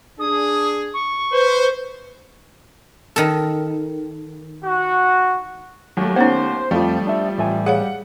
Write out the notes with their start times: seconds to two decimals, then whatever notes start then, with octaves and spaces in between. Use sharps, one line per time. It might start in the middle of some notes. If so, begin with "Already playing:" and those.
0.19 D4 G#4 D#6
0.93 C#6
1.32 B4 C5
3.16 D#3 A4
4.65 F#4
5.97 D#2 F#3 A3
6.16 B3 C#4 D#4 C5 C#5 F#5
6.71 F2 F3 G3 A3
7.07 D4 E5
7.38 A1 E5 G#5
7.66 G#4 C#5 F5 F#5